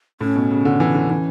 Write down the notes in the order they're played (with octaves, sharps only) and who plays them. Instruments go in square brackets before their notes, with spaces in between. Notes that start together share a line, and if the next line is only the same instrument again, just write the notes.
[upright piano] A2 [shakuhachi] C#4
[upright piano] B2
C#3
D3
E3
D3
[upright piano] E3 [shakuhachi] C#4